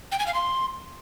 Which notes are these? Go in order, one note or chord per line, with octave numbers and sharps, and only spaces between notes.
G5
G#5
F5
C6